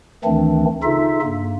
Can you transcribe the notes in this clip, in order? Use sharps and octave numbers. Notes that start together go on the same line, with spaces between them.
D2 D#3 E3 A3 C4 D4
C#3 D#4 F4 A4 E5
G2 A#3